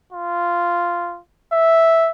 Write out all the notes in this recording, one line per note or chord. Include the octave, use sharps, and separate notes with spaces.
F4
E5